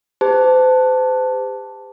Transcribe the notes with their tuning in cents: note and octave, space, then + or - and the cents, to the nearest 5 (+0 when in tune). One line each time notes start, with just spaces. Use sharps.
G4 +40 C5 -40 A5 +5